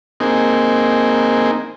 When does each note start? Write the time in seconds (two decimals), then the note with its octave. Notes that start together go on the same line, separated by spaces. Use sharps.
0.20 A#3 C4 D#4 G#4